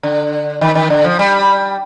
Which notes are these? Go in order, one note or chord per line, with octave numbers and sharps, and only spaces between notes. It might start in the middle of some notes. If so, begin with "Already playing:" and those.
D3
D#3
D#3
D3
F3
G3